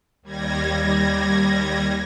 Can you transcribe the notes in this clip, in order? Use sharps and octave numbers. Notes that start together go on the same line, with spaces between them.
D#2 G3 G#6 A#6